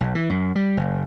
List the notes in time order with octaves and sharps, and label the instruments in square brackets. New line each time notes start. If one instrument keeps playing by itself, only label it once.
[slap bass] B1
E3
F#2
G3
F#1